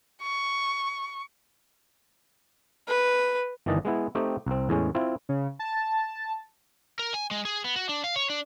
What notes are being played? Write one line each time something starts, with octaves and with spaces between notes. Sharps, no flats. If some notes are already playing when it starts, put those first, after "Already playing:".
C#6
B4
G1 D#3 E3 D5 D#5 A5
G#3 B3 E4
A3 C4 D#4 G4
C2 C4
E2 A2 G#3 C#4
C4 E4 F4
C#3
A5
A#4
G#5
G#3
G#4
B3
F#4
D4
F5
C#5
D4